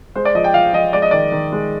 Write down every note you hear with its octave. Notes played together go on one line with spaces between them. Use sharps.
G#3 C5
D5
F3 D#5
G5
F3 F5
F3 D#5
G#3 D5
D#5
D#3 D5
D#3
G#3